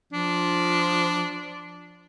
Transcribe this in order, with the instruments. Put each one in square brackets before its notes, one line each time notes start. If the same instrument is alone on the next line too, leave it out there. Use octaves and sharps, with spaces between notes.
[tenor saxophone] F3 [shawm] D4